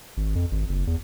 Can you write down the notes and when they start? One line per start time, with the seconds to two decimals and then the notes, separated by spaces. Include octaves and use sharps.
0.17 G#1
0.35 F2
0.52 G#1
0.69 F#1
0.87 E2